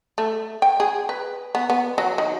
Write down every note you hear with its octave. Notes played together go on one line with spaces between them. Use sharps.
A3
G5
G#4
B4
B3
B3
F#3
D#3